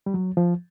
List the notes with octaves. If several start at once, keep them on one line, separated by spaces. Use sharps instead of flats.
G3
F#3
F3